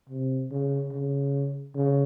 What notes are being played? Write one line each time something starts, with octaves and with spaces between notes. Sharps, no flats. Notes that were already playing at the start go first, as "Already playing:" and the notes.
C3
C#3
C#3
C#3